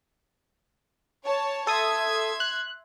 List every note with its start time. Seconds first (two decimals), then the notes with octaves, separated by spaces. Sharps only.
1.24 C#5 A5
1.67 A4 E5 C6 D#6 G#6
2.40 F#6